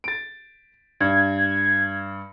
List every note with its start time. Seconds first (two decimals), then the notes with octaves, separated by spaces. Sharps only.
0.04 A6 D7
1.00 G2 G#6